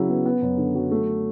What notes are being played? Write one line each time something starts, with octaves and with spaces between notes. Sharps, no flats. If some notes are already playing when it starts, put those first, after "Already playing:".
Already playing: C#3 F#3 E4
B3
B3
F#2
D3
F#3
A3